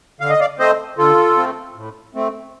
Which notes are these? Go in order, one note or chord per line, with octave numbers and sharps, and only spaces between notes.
D3 F5
D#5
D5 F5
A3 C4 C5 D#5
D3 F4 A4
A3 C4
A2
A3 C4